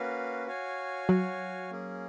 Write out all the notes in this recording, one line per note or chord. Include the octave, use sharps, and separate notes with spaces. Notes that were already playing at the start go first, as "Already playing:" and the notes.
Already playing: A#3 C#4 F#4 B4 F5
F#4 C#5 F5 G#5
F#3
A#3 C#4 G#4